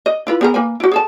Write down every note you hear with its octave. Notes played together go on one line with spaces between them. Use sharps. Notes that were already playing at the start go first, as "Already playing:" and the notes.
D#5
E4 F4 B4
B3 G#4 A#4
A#3 B4 G#5
E4 F#4
G#4 A4 A5